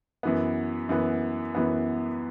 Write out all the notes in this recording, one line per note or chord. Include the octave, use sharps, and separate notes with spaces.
F#2 E3 B3
F#2 E3 B3
F#2 E3 B3